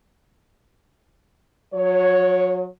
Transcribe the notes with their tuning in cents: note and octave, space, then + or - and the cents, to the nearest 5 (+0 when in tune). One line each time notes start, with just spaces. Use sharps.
F#3 -35 C#5 +0